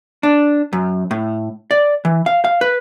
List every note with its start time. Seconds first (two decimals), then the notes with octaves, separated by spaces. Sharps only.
0.23 D4
0.73 F#2
1.11 A2
1.71 D5
2.05 E3
2.26 F5
2.44 F5
2.61 B4